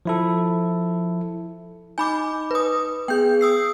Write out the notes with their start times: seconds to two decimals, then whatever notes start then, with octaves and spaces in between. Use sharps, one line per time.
0.05 F3 E4 A4
1.98 D#4 G#5 B5 D6 G6
2.51 B4 D#6
3.08 B3 G#4 G5 G6
3.41 D#6 E6 C7